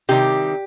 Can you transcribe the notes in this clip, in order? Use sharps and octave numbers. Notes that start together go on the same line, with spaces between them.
C3 D#3 G3 G4